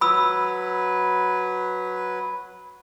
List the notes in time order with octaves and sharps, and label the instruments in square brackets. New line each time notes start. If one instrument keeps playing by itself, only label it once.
[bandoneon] F#3 B4 [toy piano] B5 E6